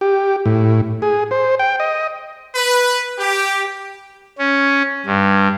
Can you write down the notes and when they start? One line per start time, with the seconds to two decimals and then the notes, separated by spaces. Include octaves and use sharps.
0.01 G4
0.46 A2
1.02 G#4
1.31 C5
1.59 G5
1.80 D#5
2.55 B4
3.19 G4
4.39 C#4
5.06 G2